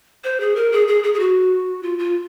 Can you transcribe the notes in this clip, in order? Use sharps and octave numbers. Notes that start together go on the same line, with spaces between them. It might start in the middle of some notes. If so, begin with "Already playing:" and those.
C5
G#4
A#4
G#4
G#4
G#4
G#4
F#4
F4
F4